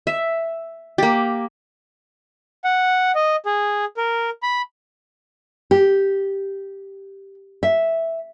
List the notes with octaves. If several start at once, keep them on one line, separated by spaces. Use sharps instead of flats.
E5
A#3 G4
F#5
D#5
G#4
A#4
B5
G4
E5